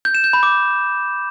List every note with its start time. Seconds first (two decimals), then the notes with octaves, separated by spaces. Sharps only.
0.05 G6
0.15 E7
0.24 G6
0.33 B5
0.43 D6